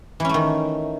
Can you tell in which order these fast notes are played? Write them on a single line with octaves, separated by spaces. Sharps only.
E3 C#4 A3 D#3